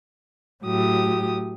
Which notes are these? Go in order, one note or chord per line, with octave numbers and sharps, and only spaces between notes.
A2 F#3 G4 D#6